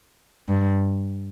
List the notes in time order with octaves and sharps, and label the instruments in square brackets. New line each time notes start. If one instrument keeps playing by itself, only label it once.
[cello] G2